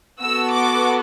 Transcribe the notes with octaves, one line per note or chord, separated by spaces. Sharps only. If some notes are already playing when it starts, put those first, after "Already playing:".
B3 F#4 A4 E6
D6